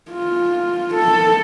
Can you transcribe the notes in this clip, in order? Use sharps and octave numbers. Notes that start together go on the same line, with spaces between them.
F4
A4